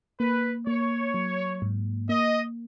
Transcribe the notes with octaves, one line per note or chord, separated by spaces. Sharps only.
A#3 B4
A#3 C#5
F#3
G#2
A#3 D#5